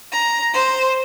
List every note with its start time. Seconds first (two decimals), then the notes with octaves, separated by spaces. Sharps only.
0.11 A#5
0.53 C5